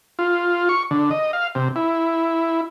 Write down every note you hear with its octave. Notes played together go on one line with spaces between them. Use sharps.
F4
C#6
D3
D#5
F5
C3
E4